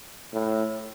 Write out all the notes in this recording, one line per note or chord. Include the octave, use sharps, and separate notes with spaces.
A2